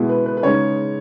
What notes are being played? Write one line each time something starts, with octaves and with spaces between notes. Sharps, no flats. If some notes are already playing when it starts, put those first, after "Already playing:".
Already playing: B2 G#3 B3 E4
B4
B4
B4
C#3 G#3 D#4 C#5